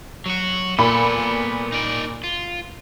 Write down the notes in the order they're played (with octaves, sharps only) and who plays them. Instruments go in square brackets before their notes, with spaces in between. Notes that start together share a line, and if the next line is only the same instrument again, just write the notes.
[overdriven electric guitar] F#3 F#4
[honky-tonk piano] A#2 B5 [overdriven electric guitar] B3 A4
[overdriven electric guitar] D#4 D5
F4